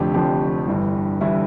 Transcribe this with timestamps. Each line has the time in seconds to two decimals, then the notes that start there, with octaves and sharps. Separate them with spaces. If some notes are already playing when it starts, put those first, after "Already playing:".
Already playing: F1 F2 D3 F3 A3 G4
0.14 F1 F2 D3 F3 G4
0.67 G1 G2 E3
1.21 G1 G2 E3 E4